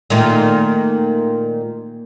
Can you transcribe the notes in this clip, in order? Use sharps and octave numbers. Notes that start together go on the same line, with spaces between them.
A#2 D#3 A3